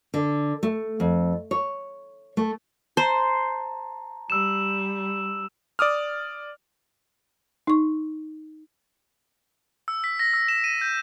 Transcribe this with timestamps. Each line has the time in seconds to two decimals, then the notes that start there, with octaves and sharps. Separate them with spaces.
0.14 D3
0.63 A3
1.00 F2
1.51 C#5
2.37 A3
2.97 C5 A5 A#5
4.30 G3 E6 E7
5.79 D5 D6 D#6 F6
7.67 D#4 C#6
9.88 E6
10.04 B6
10.20 A#6
10.34 E6
10.48 E7
10.64 D#7
10.81 G6